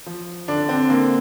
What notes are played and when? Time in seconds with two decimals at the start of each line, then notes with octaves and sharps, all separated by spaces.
0.06 F3
0.48 D3 D4
0.69 C4
0.90 D3 A#3